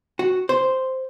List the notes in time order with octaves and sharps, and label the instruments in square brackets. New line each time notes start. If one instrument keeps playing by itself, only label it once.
[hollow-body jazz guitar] F#4
C5